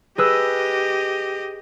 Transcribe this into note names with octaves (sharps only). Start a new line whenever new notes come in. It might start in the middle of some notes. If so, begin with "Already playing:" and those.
G4 G#4 B4 D#5 E6